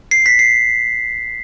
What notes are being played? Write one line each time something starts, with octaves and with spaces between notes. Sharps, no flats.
C7
B6
C7